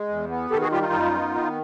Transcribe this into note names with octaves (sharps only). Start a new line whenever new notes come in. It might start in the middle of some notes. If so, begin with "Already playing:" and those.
Already playing: G#3
E2
B3
D#3 G4 A4
F#4 G#4
G3 F4 G4
D#4 F4
F#2
B3
D#3